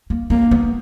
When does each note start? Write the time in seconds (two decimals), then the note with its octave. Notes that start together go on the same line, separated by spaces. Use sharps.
0.10 A#3
0.30 A#3 C#4
0.51 B3